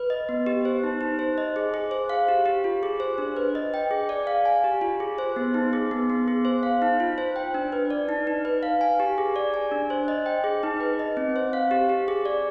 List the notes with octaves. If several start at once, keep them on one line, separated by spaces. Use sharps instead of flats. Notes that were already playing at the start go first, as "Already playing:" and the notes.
Already playing: B4
D#5
B3
G4
C5
D#4
D#4
C5
D#5
G#4
G#4
C5
F5
G4
G4
F4
G#4
C5
D4
B4
D#5
G5
G#4
D5
F5
G#5
G4
F4
G#4
C5
B3
D#4
G#4
B3
B3
G#4
C5
F5
D#4
F4
C5
G5
D4
B4
D5
D#4
D#4
B4
F5
G#5
G4
G#4
D5
G#5
D4
C5
D#5
G5
G#4
D#4
B4
D#5
C4
C5
F5
G4
G4
G#4
D5